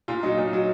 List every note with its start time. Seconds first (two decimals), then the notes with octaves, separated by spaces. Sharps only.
0.08 A#2 F4
0.23 F#3 D#4
0.38 A#2 D#4
0.53 F#3 D#4